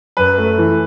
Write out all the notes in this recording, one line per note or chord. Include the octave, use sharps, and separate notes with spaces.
F#2 B4
A3
E3